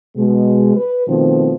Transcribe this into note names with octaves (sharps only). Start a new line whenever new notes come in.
B2 G#3
B4
B2 D#3 F3 A3 C4